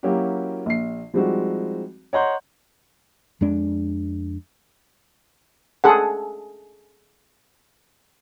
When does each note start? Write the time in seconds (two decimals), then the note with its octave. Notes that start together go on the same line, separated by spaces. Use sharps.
0.03 F#3 A#3 C#4 E4 F#4 G4
0.66 A#1 C7
1.14 F3 G3 G#3 C4 D#4 F#4
2.13 C#5 D#5 F#5 A#5 C6 G6
3.41 F2 G#3 D4
5.84 G#4 A4 F#5